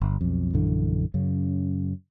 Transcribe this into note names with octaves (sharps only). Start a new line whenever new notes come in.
G1
B1 F2
A#1 F#2 D3 E3
F#2 C#3